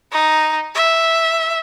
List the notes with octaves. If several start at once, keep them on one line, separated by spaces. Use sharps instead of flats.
D#4
E5